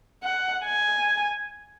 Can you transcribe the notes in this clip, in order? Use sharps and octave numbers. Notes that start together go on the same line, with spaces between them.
F#5
G#5